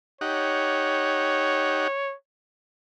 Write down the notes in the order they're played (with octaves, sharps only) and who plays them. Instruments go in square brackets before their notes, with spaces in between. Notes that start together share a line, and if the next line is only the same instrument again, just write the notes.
[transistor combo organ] D#4 G4 F#5 [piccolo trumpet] C#5